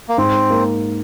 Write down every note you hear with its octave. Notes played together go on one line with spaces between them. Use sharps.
A#3
G#2 C4
A#3